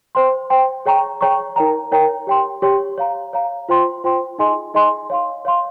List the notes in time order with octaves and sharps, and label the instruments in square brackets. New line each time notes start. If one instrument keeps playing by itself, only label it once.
[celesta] C5 G5 C6
C5 G5 C6
G#4 C#5 G5 A#5 C#6
G#4 C#5 G5 A#5 C#6
D#4 A#4 C#5 G5 A#5
D#4 A#4 C#5 G5 A#5
G4 C#5 G5 C6
G4 C#5 G5 C6
C#5 F5 A#5
C#5 F5 A#5
F4 C5 G5 C6
F4 C5 G5 C6
D#4 G#4 D#5 G#5 C6
D#4 G#4 D#5 G#5 C6
C#5 F5 C6
C#5 F5 C6